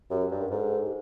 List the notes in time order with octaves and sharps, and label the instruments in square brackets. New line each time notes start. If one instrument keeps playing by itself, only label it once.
[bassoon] F#2 [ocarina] G4
[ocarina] G4
[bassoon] G2
[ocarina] A#4
[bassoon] G#2 [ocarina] A4
[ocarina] G4